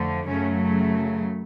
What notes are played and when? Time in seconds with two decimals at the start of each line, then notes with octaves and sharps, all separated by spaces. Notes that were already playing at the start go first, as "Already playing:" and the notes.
Already playing: F2 D3 F3 A3
0.27 F#2 C#3 F#3 A3 C#4